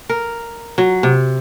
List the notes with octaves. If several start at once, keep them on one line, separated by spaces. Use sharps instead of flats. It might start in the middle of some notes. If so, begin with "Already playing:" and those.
A#4
F#3
C3